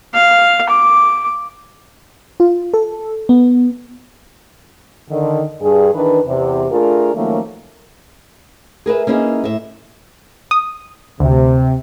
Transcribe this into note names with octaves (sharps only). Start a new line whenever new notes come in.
F5
D6
F4
A4
B3
D3 D#3
G2 G#4
D#3 E3 D4 B4
E2 C3
A3 D4 F4 G#4 A#4
D#3 F3 F#3 A3 A#3 C#4
G#4 A#4 B4 E5
A#3 C#4 D#4 E4 G#4
A2 E5
D#6
D2 C3